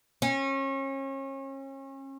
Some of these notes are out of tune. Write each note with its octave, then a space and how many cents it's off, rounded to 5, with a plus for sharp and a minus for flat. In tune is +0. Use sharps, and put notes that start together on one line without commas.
C#4 -35